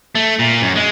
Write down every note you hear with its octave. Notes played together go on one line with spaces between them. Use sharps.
A3
A#2
F#2
G#3